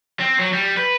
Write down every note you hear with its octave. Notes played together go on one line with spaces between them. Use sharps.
C4
F#3
G3
B4